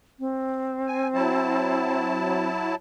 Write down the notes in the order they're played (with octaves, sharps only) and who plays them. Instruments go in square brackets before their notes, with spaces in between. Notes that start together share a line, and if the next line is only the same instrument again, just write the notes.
[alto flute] C4
[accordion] G#5
F#3 E4 A5